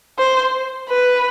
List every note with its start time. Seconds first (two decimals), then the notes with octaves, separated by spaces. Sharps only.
0.18 C5
0.89 B4